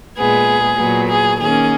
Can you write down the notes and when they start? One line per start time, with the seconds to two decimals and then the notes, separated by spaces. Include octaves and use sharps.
0.17 A#2 G#3 B3 G#4
0.78 A#2 F#3 B3
1.10 G#4
1.40 D#3 A#3 C#4 G#4